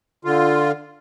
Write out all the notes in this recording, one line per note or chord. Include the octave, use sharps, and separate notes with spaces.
D3 F4